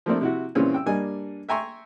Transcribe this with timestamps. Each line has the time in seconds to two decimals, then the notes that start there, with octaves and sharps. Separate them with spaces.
0.06 F3 A3 A#3 C4 D4
0.21 C3 E4 F#4
0.55 A#2 C#3 E3 G3 C4 C#4
0.74 G5 E6
0.86 G2 G3 A#3 D4 D#5 G#5
1.49 E5 G5 G#5 A#5 C6 C#6